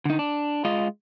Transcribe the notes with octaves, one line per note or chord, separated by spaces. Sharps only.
D3 D#4
D4
G#3 F4 D#5